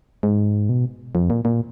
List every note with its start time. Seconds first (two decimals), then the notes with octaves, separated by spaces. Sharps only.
0.23 G#2
0.69 B2
1.15 F2
1.30 A#2
1.45 A#2